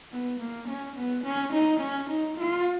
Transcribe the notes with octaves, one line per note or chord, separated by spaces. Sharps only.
B3
A#3
C#4
B3
C#4
D#4
C#4
D#4
F4